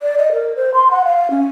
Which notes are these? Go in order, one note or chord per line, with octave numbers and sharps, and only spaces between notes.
D5
D#5
A#4
C5
C6
F#5
F5
C#4